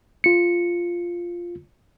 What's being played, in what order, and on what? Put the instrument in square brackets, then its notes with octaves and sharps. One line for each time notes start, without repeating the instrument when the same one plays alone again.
[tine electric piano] F4 C#7